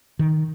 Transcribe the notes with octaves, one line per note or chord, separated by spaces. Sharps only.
D#3